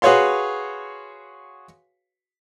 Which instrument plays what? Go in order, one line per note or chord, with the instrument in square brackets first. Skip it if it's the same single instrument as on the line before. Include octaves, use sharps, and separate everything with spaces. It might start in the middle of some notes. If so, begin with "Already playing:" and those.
[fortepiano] F#4 G#4 B4 C#5 F5 C6